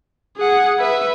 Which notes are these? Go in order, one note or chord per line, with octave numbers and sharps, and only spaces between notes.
G#4 F#5
B4 E5